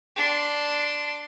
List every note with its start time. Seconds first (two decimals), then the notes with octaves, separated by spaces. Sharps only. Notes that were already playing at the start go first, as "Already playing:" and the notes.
0.16 D4 C6